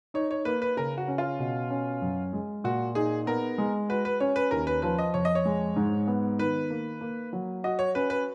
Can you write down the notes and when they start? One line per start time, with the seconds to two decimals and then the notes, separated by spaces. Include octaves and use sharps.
0.14 D#4 C#5
0.31 C#5
0.45 A#3 B4
0.62 B4
0.77 C#3 A#4
0.98 F#4
1.08 C#4
1.18 F4
1.39 B2
1.70 C#4
2.02 F#2
2.33 G#3
2.64 A#2 F#4
2.95 D#4 G#4
3.26 B3 A#4
3.58 G#3
3.89 F#4 B4
4.05 B4
4.20 C#4 C#5
4.36 B4
4.51 D#2 A#4
4.67 B4
4.82 F3 B4
4.98 D#5
5.14 F2 C#5
5.25 D#5
5.35 C#5
5.45 G#3
5.76 G#2
6.07 B3
6.39 D#3 B4
6.70 A#3
7.01 A#3
7.33 F#3
7.64 F#4 D#5
7.79 C#5
7.95 C#4 B4
8.10 B4